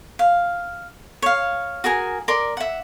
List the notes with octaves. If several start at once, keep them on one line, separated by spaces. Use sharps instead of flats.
F5
C#5 F5
F#4 G#4 A#4 G#5
A#4 D5 C6
E5 F#5